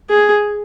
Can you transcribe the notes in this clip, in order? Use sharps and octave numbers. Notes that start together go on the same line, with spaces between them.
G#4